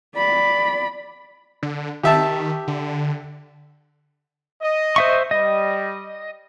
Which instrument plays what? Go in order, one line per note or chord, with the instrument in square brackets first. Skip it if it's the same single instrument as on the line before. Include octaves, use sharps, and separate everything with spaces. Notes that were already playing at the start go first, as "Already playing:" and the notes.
[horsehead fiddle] D5 B5
[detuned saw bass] D3
[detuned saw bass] D#3 [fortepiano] G4 E5 A5
[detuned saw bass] D3
[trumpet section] D#5
[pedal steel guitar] C5 E5 C#6
[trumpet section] G3 [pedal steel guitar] D#5